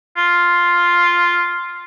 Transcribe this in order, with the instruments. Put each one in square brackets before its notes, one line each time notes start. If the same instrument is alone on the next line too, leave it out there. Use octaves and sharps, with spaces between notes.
[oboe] F4